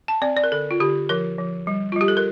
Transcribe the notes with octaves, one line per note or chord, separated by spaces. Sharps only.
A5
C4 D5
D5
A#4
D3 A4
F4
D3 G4
F3 A#4
F3
G3
F4
G3 G4
A4
A#4